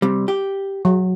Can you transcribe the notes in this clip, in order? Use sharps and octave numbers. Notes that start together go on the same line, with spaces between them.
C3 G3
G4
F#3